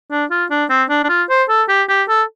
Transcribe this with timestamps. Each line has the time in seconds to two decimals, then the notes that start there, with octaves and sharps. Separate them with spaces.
0.11 D4
0.31 F4
0.50 D4
0.70 C4
0.90 D4
1.04 D4
1.09 F4
1.29 C5
1.49 A4
1.69 G4
1.89 G4
2.09 A4